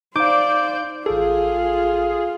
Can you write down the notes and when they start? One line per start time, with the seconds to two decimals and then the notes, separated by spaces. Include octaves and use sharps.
0.16 D#4 C5 D5 F5 D6 G6
1.06 A1 F4 G#4 A4